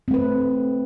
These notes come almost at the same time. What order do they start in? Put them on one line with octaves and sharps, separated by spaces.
C4 A3 B4